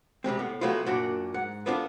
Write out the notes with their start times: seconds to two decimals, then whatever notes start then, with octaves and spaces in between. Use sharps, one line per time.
0.24 C3 G3 G#3 C4
0.39 A2 B3
0.61 C3 F#3 A3 B3 E4 F4
0.86 F#2 A#2 D4 F#4
1.34 G#2 F#5
1.66 B3 C4 D4 F4 G4 A4